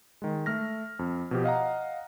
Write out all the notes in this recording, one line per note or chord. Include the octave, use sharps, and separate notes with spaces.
D#3 G#3
A3 F6 A#6
F2
B2 F3 G4
D#5 F5 F#5 A#5